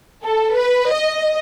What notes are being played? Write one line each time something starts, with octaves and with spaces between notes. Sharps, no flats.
A4
B4
D#5